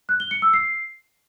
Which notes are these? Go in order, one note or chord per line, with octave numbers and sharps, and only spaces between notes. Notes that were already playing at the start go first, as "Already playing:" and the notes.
F#6
G7
C#7
E6
C7